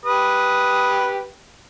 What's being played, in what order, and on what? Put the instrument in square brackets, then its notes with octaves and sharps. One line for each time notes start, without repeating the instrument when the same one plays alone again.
[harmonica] G4 B4 [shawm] D#6